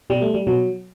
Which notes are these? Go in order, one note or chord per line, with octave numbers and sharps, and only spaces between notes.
B2 G3
A3
G3
B2 F#3